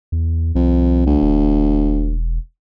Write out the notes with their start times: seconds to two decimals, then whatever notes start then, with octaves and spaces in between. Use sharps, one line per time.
0.12 E2
0.55 C2 F2
1.06 D2
1.22 E1